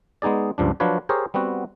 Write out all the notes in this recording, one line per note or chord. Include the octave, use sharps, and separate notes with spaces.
G#3 B3 D#4 G#4 D5
C#2 G2 F3 D4
F3 F#3 D4 F4 B4 C#5
G4 G#4 A#4 C5 C#5
G3 B3 C4 F#4